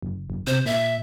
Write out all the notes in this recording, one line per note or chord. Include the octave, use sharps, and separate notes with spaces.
F#1
F#1
C3 C5
A#2 E5